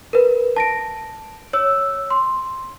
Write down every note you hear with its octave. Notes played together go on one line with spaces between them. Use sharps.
A#4 B4
A5 A#6 D7
C#5 E6
C6